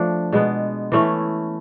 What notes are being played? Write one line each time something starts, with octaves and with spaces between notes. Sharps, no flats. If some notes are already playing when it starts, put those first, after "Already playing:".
Already playing: F3 A3 D4
B2 G#3 B3
E3 A3 C#4 E4